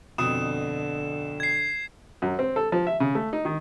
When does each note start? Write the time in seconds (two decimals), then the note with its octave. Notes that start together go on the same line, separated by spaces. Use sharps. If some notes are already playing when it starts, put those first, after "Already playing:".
0.18 F2 B2 D3 D#6 E7
1.40 G#6 C7
2.22 F#2
2.39 C4
2.56 A4
2.72 F3
2.87 E5
3.00 C#3
3.15 A3
3.33 D#4
3.45 D#3